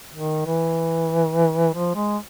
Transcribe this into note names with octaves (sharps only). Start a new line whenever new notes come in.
D#3
E3
F3
G#3